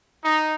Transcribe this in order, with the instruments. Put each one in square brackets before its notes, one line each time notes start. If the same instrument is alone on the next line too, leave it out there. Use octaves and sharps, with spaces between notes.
[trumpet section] D#4